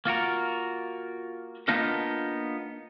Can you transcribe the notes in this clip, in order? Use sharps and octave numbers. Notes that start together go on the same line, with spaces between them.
A#3 F4 F#4 A#4
A#3 B3 D4 D#4 F4 A#4